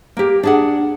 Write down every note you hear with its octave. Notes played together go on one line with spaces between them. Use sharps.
A#3 G4
D4 G#4 F#5